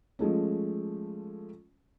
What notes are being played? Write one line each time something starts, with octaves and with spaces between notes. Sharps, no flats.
F3 G#3 A3 C#4